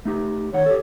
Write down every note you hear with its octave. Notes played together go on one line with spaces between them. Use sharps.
A3 D#4 G4
D#2 D#3 C#5 F#5
G4 A4